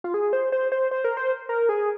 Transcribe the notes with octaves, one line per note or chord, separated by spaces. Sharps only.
F4
G#4
C5
C5
C5
C5
A#4
C5
A#4
G#4